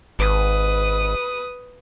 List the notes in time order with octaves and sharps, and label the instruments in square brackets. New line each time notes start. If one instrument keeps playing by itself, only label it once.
[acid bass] G#1 [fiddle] B4 D#6